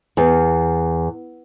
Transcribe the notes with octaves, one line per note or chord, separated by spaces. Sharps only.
E2